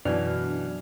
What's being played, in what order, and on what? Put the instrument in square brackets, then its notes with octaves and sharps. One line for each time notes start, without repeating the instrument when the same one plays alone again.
[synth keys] F#2 D4 F6 [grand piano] B2 E3